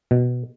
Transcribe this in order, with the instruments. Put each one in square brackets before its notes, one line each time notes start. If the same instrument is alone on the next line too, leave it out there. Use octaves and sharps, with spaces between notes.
[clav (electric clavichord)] B2